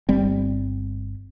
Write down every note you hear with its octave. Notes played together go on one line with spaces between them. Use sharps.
G1 G3 C4